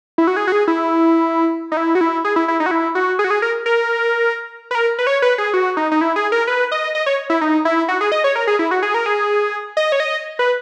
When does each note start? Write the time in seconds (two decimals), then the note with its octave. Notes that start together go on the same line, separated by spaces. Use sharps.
0.18 E4
0.27 F#4
0.37 G#4
0.48 F#4
0.52 G#4
0.68 E4
1.72 D#4
1.77 E4
1.95 F#4
2.01 E4
2.25 G#4
2.36 E4
2.48 E4
2.60 D#4
2.66 F#4
2.71 E4
2.95 F#4
3.19 G#4
3.24 F#4
3.30 G#4
3.42 A#4
3.66 A#4
4.71 B4
4.75 A#4
4.99 B4
5.07 C#5
5.22 B4
5.38 G#4
5.54 F#4
5.77 D#4
5.92 D#4
6.01 E4
6.16 G#4
6.32 A#4
6.47 B4
6.72 D#5
6.95 D#5
7.06 C#5
7.30 E4
7.41 D#4
7.65 E4
7.89 F#4
8.01 G#4
8.12 D#5
8.24 C#5
8.36 A#4
8.47 G#4
8.59 E4
8.71 F#4
8.83 G#4
8.94 A#4
9.06 G#4
9.77 D#5
9.92 C#5
10.00 D#5
10.39 B4